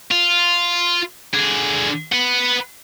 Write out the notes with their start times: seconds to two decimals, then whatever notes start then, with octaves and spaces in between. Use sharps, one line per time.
0.11 F4
1.34 D3 G#4
2.12 B4 F#5